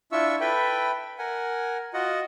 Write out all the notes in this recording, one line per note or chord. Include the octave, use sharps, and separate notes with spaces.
D4 E4 F4 E5 C#6 E6
A4 B4 E5 G5 B5
A#4 F#5 G#5
F4 F#4 D#5 F#5